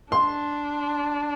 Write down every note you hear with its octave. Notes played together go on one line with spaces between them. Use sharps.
D4 C6